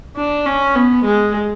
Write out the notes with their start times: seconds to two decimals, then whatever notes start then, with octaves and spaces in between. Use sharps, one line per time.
0.16 D4
0.46 C#4
0.75 B3
1.05 G#3